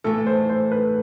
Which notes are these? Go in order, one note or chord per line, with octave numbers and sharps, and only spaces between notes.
A2 E3 A3 A4
C5
C5
B4